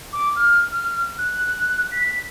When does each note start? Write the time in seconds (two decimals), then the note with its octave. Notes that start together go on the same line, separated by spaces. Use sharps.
0.13 D6
0.36 F6
0.72 F6
1.18 F#6
1.91 B6